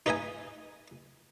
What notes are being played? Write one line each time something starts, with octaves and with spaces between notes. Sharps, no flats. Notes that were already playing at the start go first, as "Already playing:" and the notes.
D#4 B4 D#5 E5 G#5